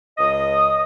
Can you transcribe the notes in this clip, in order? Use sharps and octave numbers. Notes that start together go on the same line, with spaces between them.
C#2 D#5 D#6